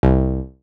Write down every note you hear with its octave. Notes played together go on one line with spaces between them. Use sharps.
C2